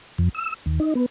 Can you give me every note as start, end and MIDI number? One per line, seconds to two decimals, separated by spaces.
0.18 0.29 41
0.35 0.54 88
0.66 0.79 39
0.80 0.94 63
0.95 1.06 59